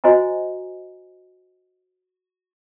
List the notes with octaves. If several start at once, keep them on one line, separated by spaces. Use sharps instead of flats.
F#4 C5 D#5 G#5 A#5